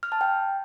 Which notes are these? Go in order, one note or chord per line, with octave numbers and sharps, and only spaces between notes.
F6
A5
G5